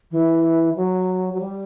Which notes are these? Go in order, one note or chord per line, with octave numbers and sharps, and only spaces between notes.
E3
F#3
F#3
G3